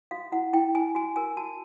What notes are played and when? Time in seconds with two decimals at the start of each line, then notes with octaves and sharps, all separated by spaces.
0.11 F#4 F5
0.32 E4 F#5
0.53 E4 G5
0.75 E4 G#5
0.95 F#4 G#5
1.16 A#4 G#5
1.37 F#4 A5